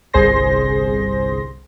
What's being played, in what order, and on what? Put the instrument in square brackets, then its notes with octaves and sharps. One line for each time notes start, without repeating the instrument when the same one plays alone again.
[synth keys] G1 C2 G#4 C5 C6 A#6